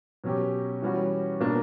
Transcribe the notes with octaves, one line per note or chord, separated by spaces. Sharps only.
B2 F#3 C#4 G4
E3 G3 C#4 F#4
B2 A#3 D4